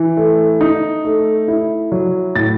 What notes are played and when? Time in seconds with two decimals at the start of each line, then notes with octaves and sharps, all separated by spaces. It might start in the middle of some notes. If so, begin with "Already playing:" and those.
Already playing: E3
0.17 A3
0.61 D#4
1.05 A3
1.48 E4
1.92 F#3
2.35 A2 A6